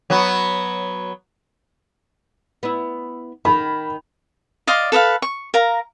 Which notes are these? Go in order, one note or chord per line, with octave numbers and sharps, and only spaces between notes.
F#3 B3 F#4
B3 E4
D#3 B5
D5 D#5 F5 C6
A4 B4 D#5 F5
C#6
A#4 F5 A#5